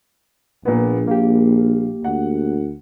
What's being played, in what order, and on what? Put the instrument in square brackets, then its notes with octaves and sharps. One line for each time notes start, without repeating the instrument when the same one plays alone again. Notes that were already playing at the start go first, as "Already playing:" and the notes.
[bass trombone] A#1 [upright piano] A#2 B3
[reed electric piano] A#3 G4 [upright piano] F5
[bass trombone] D2 [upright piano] F#5